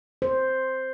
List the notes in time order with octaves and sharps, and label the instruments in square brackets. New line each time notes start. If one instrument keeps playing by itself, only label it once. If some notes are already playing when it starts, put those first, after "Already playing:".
[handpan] C5